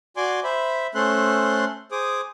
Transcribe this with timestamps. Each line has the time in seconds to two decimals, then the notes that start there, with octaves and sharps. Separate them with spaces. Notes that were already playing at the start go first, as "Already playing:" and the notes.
0.17 F#4 D5 G#5 C6 D6
0.44 C5 E5 B5
0.95 A3 C#4 A4 C5 C6 F#6
1.92 G#4 C5 D6 D#6